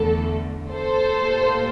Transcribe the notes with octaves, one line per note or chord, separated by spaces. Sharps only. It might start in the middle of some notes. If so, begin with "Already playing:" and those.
Already playing: E2 D3 A3 A4
A4 C5
A2 G3 A#3